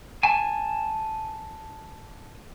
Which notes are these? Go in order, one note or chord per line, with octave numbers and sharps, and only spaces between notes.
G#5 A5